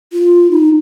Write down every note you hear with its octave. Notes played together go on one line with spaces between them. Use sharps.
F4
D#4